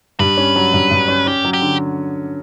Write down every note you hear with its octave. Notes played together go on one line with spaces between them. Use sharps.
G2 B4
C#4
F#3
G2
G2
C#4
C#4 G4
F#3
G4
D3